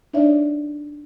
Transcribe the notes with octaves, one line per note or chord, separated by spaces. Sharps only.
D4 D#4 C#5 D5 E5